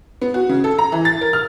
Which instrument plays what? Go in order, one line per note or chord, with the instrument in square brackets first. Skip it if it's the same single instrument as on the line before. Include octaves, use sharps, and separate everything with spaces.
[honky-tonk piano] B3
F#4
C#3
A4
A#5
E3
A6
A#4
F6